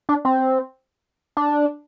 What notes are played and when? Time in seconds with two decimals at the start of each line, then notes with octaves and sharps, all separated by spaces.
0.09 D4
0.25 C4
1.37 D4